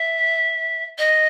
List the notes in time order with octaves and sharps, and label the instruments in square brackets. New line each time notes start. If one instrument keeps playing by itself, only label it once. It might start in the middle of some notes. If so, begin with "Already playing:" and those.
Already playing: [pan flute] E5
D#5